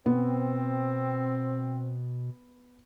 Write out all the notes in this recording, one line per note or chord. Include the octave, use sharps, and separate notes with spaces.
B2 B3 C4